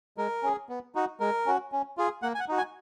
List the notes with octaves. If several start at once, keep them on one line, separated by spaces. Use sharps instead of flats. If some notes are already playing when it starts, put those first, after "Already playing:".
G#3 A#4
C#4 G#4
B3
D#4 F#4
G#3 A#4
C#4 F#4
C#4
F4 G#4
A#3 F#5
G#5
F#5
D#4 F#4
G#5